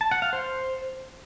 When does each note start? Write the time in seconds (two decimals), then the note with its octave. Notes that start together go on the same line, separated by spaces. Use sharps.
0.01 A5
0.11 F#5
0.22 F5
0.33 C5